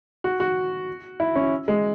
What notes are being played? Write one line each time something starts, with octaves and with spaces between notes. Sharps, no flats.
F#4
F#4
E4
C#4
G#3